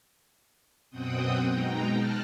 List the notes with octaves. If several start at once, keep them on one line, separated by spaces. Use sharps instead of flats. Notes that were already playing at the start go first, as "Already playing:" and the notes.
F#2 B2 C4 F#5 G5 D#6
B2 G#3 D#4 G5 A#5
A5 F6 F#6